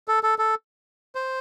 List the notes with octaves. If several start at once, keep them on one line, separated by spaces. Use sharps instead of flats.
A4
A4
A4
C5